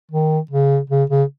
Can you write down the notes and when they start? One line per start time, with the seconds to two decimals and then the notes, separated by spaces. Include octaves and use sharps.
0.12 D#3
0.51 C#3
0.90 C#3
1.10 C#3